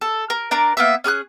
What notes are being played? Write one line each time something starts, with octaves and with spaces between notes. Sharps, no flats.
A4
A#4
D4 A#4 D5
A#3 B3 E5
C#4 G#4 D#6 F#6